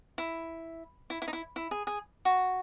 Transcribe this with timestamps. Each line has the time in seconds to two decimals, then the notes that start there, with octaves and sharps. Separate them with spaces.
0.18 E4
1.10 E4
1.22 E4
1.28 D#4
1.33 E4
1.56 E4
1.71 G#4
1.87 G#4
2.25 F#4